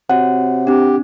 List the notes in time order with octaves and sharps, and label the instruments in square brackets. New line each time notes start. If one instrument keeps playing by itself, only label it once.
[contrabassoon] C3 [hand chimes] F#4 C#5 [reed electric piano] F#5
[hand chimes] C4 D4 [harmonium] G4